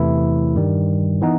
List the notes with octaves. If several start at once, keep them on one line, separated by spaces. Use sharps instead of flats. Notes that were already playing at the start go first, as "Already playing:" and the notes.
Already playing: E2 C3 E3 A3 E4
G2 D#3 G3
E3 B3 D#4